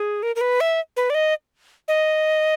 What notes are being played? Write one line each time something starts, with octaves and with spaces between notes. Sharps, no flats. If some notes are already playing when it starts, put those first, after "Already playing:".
Already playing: G#4
A#4
A#4
B4
E5
B4
D5
D#5
D#5